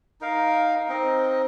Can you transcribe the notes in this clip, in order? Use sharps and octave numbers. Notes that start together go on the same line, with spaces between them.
D#4 A#4 F5
C4 D#4 A#4 D#5